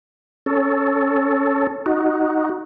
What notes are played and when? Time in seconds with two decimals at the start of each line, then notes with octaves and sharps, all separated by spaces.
0.46 C#4 A4
1.86 D#4 F#4